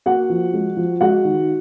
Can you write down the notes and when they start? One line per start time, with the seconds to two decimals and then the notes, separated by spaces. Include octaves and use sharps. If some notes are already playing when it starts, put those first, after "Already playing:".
0.06 A#3 F#4 F#5
0.30 F3
0.53 G#3
0.77 F3
1.01 G#3 F#4 F#5
1.25 D#3